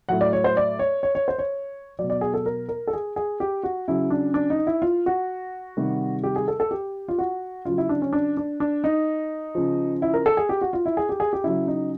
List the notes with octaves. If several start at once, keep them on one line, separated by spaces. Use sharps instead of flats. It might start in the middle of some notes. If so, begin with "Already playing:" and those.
A2 F#3 F#5
D5
C#5
C5
D5
C#5
C#5
C#5
C5
C#5
B2 F#3 D5
D5
G#4
A4
A#4
A#4
A4
G#4
G#4
G4
F#4
C#3 F#3 E4
D4
D4
D#4
E4
F4
F#4
C3 D#3 G3
G4
G#4
A4
A4
G4
F4
F#4
C#3 F#3 F4
E4
D4
C#4
D4
D4
D4
D#4
C#3 F3
E4
A#4
A4
G#4
G4
F#4
F4
E4
G#4
G4
G#4
G4
C#3 F#3 E4
D#4